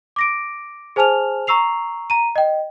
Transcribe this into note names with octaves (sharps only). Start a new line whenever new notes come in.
D6 A#6 D7
G#4 C5 G#5 A5 F6 F7
A#5 C#6 E6 C7 F7
A#5 D#7
D#5 G5